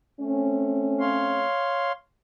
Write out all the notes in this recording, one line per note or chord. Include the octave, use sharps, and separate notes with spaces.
A3 C4 C#4
C#5 F5 C6